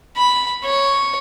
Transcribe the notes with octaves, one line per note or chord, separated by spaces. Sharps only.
B5
C#5